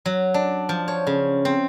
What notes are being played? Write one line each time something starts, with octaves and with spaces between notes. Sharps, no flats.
F#3
D4
F3
C#5
C#3
C4